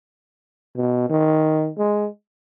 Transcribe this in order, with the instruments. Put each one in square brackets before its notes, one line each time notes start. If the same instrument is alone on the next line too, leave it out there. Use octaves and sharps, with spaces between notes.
[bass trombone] B2
D#3
G#3